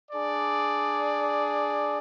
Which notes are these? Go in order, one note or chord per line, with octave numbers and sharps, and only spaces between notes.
D4 G#4 D5